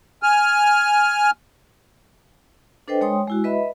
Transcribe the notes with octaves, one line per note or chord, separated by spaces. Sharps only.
G#5 F6
D4 A4 B4 C5 D#5 G5
G#3 C#5 G5 C6 D#6
G#3 E4 F#4
B4 D#5 E5 B5